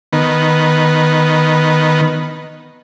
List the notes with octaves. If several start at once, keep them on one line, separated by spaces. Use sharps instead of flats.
D#3 B3